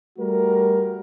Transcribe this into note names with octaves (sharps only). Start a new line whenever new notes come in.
G3 A3 F#4 A#4